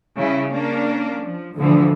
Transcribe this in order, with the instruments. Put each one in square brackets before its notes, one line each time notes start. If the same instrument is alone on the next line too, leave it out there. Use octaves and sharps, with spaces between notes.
[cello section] C#3 G3 E4
A#3 C#4 D4
F3
[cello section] D2 E3 F3 [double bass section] D3